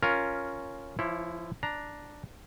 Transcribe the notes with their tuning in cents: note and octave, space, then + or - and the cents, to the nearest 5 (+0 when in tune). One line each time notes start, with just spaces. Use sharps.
C#4 +0 F4 +0 A#4 +0
F3 -30 E4 +0 C#5 -30
D4 +0 A#5 +10